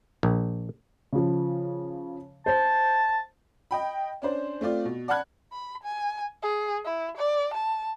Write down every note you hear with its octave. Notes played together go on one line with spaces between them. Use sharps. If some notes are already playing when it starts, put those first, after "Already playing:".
A#1
C#3 F3
C5 A5
D#5 G5 B5
C#4 D4 C5
A3 C4 F4 D5
B2
D5 F#5 A5 B5 F#6 G#6
B5
G#5
G#4
E4
D5
A5